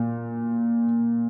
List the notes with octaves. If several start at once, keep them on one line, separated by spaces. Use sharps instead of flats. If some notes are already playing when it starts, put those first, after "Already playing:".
Already playing: A#2